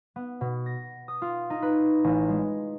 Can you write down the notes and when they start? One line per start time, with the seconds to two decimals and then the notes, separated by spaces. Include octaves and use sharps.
0.16 B3
0.41 B2
0.66 A#6
1.08 D#6
1.22 F4
1.50 D#4
1.62 B4
2.04 A1
2.29 G#3